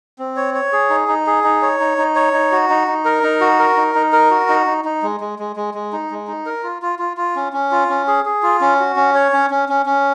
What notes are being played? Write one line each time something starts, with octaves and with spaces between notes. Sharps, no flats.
C4
C#5
C#5
G#4
D#4
D#4
G#4
D#4
C#5
D#4
D#4
C#5
D#4
F#4
D#4
D#4
A#4
D#4
F#4
A#4
D#4
D#4
A#4
F#4
D#4
D#4
D#4
G#3
G#3
G#3
G#3
G#3
D#4
G#3
D#4
A#4
F4
F4
F4
F4
C#4
C#4
F4
C#4
G#4
G#4
F4
C#4
F#4
C#4
C#5
C#4
C#4
C#4
C#4